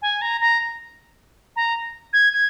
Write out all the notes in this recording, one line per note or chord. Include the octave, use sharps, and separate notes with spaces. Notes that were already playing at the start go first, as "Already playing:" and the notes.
G#5
A#5
A#5
A#5
G#6
G#6